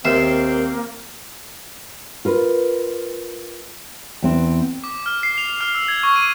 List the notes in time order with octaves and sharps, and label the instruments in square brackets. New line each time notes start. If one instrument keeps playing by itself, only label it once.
[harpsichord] D#2 E5 [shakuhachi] A#3 [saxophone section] C4 [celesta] F6 C7 E7
[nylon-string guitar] F4 A#4 B4
E2 C4
[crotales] D6
F6
C7
F7
F6
E6
G#6
C#6
D#7